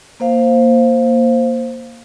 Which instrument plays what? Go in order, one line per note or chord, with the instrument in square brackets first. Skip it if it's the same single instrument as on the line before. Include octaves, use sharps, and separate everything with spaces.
[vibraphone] A#3 C5 F5